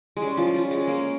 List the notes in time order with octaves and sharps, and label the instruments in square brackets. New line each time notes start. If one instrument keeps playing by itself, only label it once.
[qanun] G3 G#3 [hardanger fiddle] C#4
[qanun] F3
G3
G#3
A#3